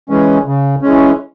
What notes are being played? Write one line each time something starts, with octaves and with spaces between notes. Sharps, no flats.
E3 G#3 C#4
C#3
E3 G#3 C#4